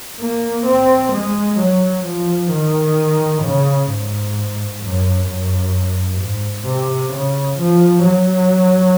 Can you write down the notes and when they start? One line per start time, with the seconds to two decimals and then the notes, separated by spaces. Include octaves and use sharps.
0.20 A#3
0.67 C4
1.13 G#3
1.59 F#3
2.05 F3
2.52 D#3
3.43 C#3
3.90 G#2
4.82 F#2
5.29 F#2
6.20 G#2
6.66 C3
7.13 C#3
7.59 F3
8.05 F#3